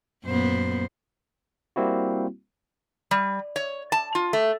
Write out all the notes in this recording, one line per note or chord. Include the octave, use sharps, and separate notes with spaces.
F#2 A#2 B3 C5
G3 A#3 C4 E4 F#4
G3
C#5
A5
F4
A3